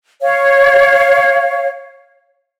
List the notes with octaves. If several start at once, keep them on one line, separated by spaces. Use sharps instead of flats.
C#5 F5